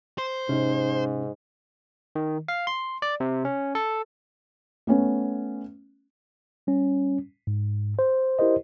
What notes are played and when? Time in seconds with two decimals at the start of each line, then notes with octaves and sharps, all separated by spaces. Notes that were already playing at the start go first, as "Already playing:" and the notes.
0.18 C5
0.49 G#2 C3 C#4 D#4
2.16 D#3
2.48 F5
2.67 C6
3.02 D5
3.20 C3
3.45 C#4
3.75 A4
4.87 A3 B3 C#4
6.67 G3 C#4
7.47 G#2
7.99 C5
8.39 E4 G4 A#4 C5 D#5